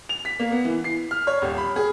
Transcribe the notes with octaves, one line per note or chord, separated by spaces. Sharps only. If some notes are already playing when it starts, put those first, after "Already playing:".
F7
B6
A#3
B3
E3
C7
F6
C#5
D#1
B5
G#4